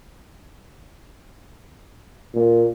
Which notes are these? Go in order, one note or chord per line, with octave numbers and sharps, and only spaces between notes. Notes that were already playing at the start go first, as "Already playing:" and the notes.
A#2